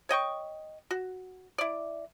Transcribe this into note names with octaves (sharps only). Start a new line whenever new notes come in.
C#5 D#5 G5 C#6
F#4
E4 D5